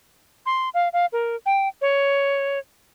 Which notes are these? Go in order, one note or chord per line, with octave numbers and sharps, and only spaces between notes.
C6
F5
F5
A#4
G5
C#5